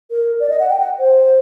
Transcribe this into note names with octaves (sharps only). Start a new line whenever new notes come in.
A#4
D5
D#5
F#5
G5
F#5
C5